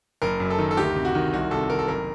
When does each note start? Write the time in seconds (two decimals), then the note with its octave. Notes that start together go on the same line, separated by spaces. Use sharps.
0.22 F#1 A#4
0.40 F#2
0.50 A4
0.58 D#3
0.71 A4
0.77 D2 G4
0.96 C3
1.05 F#4
1.15 D#3
1.33 C2 F#4
1.51 C3 A4
1.70 D#3 A#4
1.79 A4
1.88 F#1 A#4